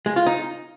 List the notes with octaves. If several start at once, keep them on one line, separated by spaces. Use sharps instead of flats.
G#3
F4
D#4